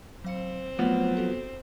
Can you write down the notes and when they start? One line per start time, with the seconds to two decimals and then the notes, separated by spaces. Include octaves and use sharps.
0.25 F#3 C4 F5 C#7
0.79 F3 F#3 A3 B3
1.17 F#4 A4